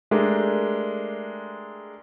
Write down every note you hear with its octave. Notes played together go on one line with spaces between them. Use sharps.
G#3 A3 D4 G4 A#4